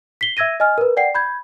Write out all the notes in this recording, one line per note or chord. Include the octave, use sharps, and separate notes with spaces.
B6 C7 G7
E5 E6 G#6 A#6 D#7
D#5 G#5 F6
A#4 B4
D5 F#5 G5 C7
B5 G6 G#6